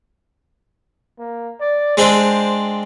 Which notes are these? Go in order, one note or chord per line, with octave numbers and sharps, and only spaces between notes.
A#3
D5
G#3 C4 D4 C5